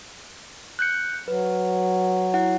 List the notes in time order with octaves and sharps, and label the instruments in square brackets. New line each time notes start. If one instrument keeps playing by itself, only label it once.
[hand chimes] F#6 G6 C#7
[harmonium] F#3 [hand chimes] B4
[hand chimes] E4 F#5